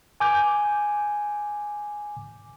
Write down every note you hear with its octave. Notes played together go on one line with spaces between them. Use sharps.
G#5 D6 G6